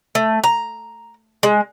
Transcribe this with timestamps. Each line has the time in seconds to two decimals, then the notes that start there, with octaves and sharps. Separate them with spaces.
0.15 A3
0.44 A#5
1.43 G#3